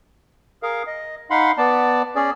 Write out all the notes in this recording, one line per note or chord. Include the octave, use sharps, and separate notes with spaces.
G#4 A#4 F5
D#5
D#4 F5 F#5 B5 C6
B3 D5 A5
C#4 G#4 D5